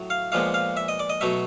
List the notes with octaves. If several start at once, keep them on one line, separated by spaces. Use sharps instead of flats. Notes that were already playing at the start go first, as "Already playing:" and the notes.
Already playing: A2 F#3
F5
A#2 F3 G#3 B3 F5
F5
E5
D#5
D5
D#5
B2 F#3 A3 E5